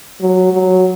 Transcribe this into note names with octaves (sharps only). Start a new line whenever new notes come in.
F#3
F#3